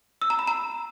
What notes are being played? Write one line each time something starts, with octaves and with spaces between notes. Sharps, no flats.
E6
A#5
B5
A#5